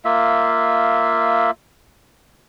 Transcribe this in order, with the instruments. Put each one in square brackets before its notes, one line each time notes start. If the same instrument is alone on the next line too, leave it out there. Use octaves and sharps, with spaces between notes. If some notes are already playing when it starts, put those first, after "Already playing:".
[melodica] A#3 F4 E5